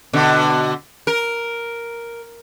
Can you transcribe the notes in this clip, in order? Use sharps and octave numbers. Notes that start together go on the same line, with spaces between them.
B2 D3
A#4